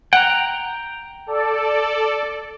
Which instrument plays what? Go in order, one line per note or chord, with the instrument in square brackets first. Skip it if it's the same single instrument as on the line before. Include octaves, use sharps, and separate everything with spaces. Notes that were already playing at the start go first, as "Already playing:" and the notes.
[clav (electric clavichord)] F#5 [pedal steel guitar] G5 A#5
[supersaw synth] A4 D5